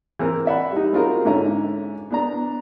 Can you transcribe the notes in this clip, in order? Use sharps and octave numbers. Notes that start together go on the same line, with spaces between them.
E3 C4 A#4
D5 E5 F#5 B5
G3 D#4
C4 C#4 F4 F#4 G#4 A#4
G#2 D3 C#4 E5 A#5
B3 D4 A#5